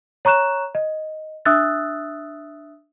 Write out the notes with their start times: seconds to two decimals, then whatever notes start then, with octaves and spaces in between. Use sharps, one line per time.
0.25 C#5 A#5 C#6 F#6 E7
0.75 D#5
1.45 D4 E5 D#6 E6 F#6 A6